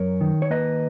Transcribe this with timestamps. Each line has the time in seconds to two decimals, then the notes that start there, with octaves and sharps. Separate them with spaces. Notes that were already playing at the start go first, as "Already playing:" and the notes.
Already playing: F#2 A#4 C#5
0.21 D#3
0.42 C#5
0.50 A#3 B4 D#5